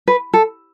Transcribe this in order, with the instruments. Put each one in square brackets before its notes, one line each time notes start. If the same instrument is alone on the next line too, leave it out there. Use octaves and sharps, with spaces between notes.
[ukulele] B4
A4